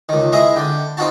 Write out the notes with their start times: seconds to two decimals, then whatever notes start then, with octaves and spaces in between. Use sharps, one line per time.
0.09 C#2 D#3
0.32 G#3 E4 G#4 D#5
0.56 D3 G5
0.97 C4 D#4 F4 F#4 A5